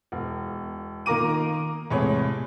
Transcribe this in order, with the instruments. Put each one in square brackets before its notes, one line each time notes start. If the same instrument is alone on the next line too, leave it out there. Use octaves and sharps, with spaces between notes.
[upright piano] E1
D#3 A#3 A#4 A#5 D6 D#7
E2 A2 C3 G#3 C#5